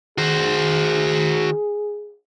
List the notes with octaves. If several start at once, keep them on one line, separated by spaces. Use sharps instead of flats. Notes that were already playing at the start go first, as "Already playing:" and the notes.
D#3 F#4 G#4 C5